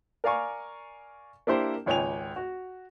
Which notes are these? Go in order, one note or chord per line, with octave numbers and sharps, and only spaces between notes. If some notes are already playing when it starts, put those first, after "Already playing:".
A#4 D5 F5 G#5 C#6
A#3 D4 E4 G4 C5
G#1 C#2 C#5 G5 G#5 F7
F#4